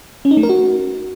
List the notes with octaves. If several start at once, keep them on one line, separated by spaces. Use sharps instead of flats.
C#4
D#4
A3
A#4
F#4